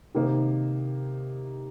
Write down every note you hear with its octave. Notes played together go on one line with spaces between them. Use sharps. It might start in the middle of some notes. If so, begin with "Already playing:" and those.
C3 D#3 A#3 D#4